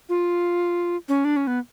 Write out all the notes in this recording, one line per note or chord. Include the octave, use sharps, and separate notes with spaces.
F4
C#4
D4
C#4
B3